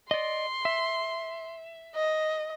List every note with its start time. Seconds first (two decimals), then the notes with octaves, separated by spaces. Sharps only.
0.11 D5 D#5 C6
0.65 E5
1.95 D#5